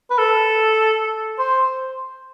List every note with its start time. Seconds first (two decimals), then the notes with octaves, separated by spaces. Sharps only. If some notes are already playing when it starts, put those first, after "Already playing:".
0.10 B4
0.18 A4
1.39 C5